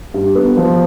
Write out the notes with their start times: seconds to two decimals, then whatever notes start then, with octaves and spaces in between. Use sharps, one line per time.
0.14 G2
0.35 B3
0.57 F3